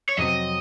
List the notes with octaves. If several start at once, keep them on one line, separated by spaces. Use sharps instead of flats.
C#5
F2 C3 F#3 C4 D#5